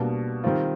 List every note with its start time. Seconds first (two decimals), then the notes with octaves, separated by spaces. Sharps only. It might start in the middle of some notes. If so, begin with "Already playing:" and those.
Already playing: B2 G3 A#3 D4
0.44 D#3 G3 C4 F4